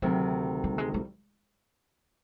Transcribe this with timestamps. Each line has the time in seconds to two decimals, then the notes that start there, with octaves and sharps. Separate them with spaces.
0.02 D2 C3 D#3 F#3
0.64 G3
0.78 G#3
0.94 G3